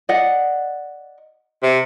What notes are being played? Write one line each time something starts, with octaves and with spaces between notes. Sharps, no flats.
D5 D#5 F#5
C3